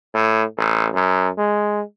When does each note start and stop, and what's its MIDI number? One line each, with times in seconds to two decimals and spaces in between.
0.14 0.44 45
0.57 0.88 33
0.94 1.29 42
1.38 1.82 56